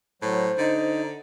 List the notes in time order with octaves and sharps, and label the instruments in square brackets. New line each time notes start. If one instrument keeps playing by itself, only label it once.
[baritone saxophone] A2 [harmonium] F#3 [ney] C5
[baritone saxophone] D3 [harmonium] D#4